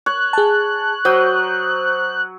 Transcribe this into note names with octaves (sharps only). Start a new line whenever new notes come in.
C#5 F#6
G#4 A5
F#3 C5 D#6 G6